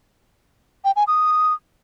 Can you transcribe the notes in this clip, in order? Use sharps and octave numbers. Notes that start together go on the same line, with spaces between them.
G5
G#5
D#6